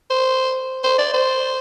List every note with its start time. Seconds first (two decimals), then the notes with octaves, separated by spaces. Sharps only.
0.10 C5
0.84 C5
0.98 D5
1.13 C5